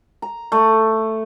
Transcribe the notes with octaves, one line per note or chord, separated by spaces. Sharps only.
A#5
A3